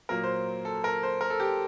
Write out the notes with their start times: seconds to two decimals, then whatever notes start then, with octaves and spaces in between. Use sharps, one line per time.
0.09 A#2 F#3 A#3 A#4
0.23 C5
0.65 A4
0.84 A#4
1.03 C5
1.21 A#4
1.30 A4
1.40 G4